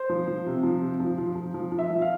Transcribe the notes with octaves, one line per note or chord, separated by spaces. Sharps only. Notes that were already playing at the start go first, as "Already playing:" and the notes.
Already playing: C5
F3
F3
C3
F3
C3
F3
F3
F3
F3
F3
E5
F3
F5